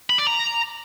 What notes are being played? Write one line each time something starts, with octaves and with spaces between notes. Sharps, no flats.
B5
D5
A#5